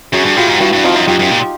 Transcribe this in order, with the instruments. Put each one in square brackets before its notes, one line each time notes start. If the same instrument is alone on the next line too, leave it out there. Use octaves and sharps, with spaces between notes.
[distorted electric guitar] F#2 [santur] F#4 G#4
[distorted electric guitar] G2
[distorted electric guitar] A2 [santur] F4 G4
[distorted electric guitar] G#2
[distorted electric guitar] G2 [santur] E4 F#4
[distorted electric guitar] G2
[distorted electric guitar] F2 [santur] D#4 F4
[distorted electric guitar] F#2
[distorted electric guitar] F#2 [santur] F4 G4
[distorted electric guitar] F#2
A#2